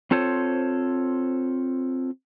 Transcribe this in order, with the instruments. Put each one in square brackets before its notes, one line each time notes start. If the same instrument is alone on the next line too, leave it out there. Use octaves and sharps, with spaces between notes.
[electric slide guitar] C4 F4 A4 C5 C#5